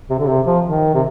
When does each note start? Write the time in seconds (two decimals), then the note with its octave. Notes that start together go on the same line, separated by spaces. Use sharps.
0.09 C3
0.19 D3
0.27 C3
0.46 F3
0.64 D#3
0.94 C3